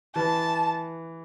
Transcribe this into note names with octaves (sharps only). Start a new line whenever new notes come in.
E3 A5